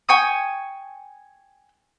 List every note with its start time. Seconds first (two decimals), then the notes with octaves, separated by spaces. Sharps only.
0.09 G5 G#5 C#6 D#6